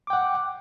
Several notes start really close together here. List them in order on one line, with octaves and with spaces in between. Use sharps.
D6 G5 F#5